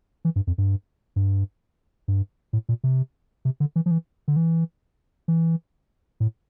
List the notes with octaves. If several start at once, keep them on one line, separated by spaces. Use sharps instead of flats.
E3
G2
F2
G2
G2
G2
A2
A#2
C3
C3
D3
E3
F3
E3
D3
E3
E3
A2